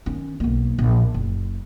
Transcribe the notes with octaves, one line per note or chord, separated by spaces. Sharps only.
D#3 C#4
B1 A#3
A#1
F#1